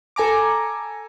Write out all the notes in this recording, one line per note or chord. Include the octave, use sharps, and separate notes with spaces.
A4 G#5 A#5 D6